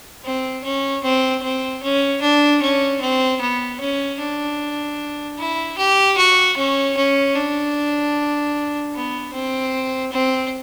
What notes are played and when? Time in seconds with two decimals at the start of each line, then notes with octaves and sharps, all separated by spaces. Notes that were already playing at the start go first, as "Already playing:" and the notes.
0.25 C4
0.64 C#4
1.04 C4
1.43 C4
1.83 C#4
2.22 D4
2.62 C#4
3.01 C4
3.41 B3
3.80 C#4
4.19 D4
5.38 E4
5.78 G4
6.17 F#4
6.57 C#4
6.97 C#4
7.35 D4
8.94 B3
9.33 C4
10.12 C4